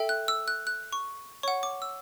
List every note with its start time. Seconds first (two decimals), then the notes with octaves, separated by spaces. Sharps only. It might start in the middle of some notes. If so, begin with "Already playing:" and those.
Already playing: A4 E5 G5
0.09 F#6
0.28 E6
0.48 F#6
0.67 F#6
0.92 C#6
1.43 C#5 F#5 C#6
1.63 D6
1.82 E6